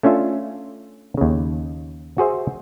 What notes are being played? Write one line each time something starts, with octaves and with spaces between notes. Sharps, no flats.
A3 C#4 D4 F4 E5
D#2 C#3
F#4 G#4 C5 E5